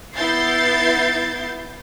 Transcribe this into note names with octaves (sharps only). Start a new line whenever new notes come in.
B3 E4 G6 A6 C7